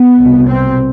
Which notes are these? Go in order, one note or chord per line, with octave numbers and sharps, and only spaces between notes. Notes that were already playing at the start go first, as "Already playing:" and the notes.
Already playing: B3
C2 B2
C4